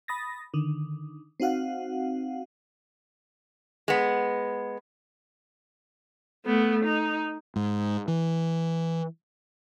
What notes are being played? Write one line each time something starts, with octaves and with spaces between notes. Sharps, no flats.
B5 D#6 A6 A#6
D3 D#3
C4 D#4 F#4 F5 F#5
G#3 B3
A3 B3
D#4
G#2
E3